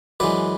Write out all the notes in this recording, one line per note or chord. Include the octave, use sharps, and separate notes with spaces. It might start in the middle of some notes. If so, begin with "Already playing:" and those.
F#2 E3 G#3 B4 D5